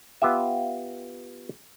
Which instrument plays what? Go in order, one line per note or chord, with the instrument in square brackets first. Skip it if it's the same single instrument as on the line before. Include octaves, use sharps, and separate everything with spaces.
[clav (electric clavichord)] B3 F4 G4 E5